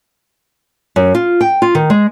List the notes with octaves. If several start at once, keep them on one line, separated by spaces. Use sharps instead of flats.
F#2
F4
G5
F4
D#3
G#3